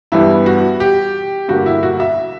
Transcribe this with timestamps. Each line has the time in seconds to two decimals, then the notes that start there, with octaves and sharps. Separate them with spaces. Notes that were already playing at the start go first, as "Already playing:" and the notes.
0.12 G2 E3 G3 B3 E4
0.46 F#4
0.80 G4
1.48 G2 D3 A#3 F#4
1.66 E4
1.83 F#4
2.00 E5